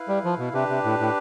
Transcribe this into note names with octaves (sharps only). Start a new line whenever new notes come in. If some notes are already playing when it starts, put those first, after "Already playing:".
Already playing: E4 B4 F5
G3
F3
B2
C3 D4 G4 B4
C3
A2
A2